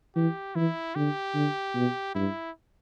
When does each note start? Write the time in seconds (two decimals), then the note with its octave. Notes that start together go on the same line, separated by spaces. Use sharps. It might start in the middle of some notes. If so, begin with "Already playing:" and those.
0.15 E3 G4
0.55 E3 E4
0.95 D3 G4
1.35 D3
1.75 B2
2.15 G2 E4